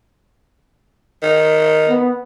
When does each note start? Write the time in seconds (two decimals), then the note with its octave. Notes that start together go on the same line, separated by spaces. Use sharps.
1.23 D#3
1.89 B3